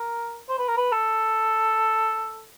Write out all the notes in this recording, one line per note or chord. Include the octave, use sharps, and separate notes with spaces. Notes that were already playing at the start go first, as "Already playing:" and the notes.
Already playing: A#4
C5
B4
A#4
B4
A4